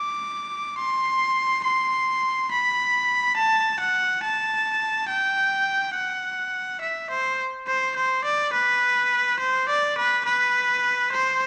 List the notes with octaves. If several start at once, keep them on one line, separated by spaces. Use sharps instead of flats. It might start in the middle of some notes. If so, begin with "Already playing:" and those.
Already playing: D6
C6
C6
B5
A5
F#5
A5
G5
F#5
E5
C5
C5
C5
D5
B4
C5
D5
B4
B4
C5